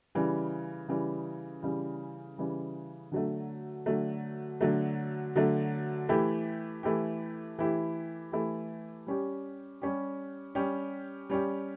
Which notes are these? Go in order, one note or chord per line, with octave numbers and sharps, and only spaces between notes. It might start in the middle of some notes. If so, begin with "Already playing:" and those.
C#3 E3 G3
C#3 E3 G3
C#3 E3 G3
C#3 E3 G3
D3 F#3 A3
D3 F#3 A3
D3 F#3 A3
D3 F#3 A3
E3 A3 E4 G4
E3 A3 E4 G4
E3 A3 E4 G4
E3 A3 E4 G4
G3 C#4 G4
G3 C#4 G4
G3 C#4 G4
G3 C#4 G4